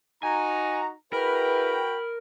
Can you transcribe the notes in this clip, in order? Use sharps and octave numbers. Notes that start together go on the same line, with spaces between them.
D#4 F#4 G#5 A#5
E4 F#4 G#4 A#4 B4 G5 B5